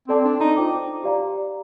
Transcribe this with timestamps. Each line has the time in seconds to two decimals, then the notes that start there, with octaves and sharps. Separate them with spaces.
0.08 C4 A4 D5 A5 D6
0.24 D4
0.40 D#4
0.56 F4 C5 G5 D6
1.04 G4 D5 F5 A#5